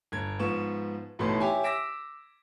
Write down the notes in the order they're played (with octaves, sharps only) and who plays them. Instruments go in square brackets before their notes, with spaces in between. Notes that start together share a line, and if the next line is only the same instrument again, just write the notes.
[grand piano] G1 G#6
G#2 F3 B3 C#6 E7
A1 B2 E3 A3 D#4 C6
G4 C#5 E5 G#5
D6 E6 A#6 B6 D7 E7